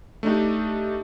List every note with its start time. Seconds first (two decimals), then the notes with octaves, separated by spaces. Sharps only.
0.23 A3 D4 D#4 G4